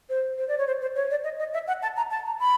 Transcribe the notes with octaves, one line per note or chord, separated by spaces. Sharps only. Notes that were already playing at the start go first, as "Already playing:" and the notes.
C5
C5
D5
C#5
C5
C5
C#5
D5
D#5
D#5
E5
F#5
A5
A#5
A5
A#5
B5